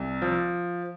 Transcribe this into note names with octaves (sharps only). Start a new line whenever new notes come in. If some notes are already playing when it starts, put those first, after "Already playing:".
Already playing: C2
F3